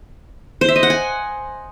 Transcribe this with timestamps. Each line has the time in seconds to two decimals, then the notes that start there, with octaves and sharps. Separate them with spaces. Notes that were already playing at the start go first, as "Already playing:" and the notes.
0.61 C5
0.68 E5
0.76 D#5
0.83 F#5
0.90 G#5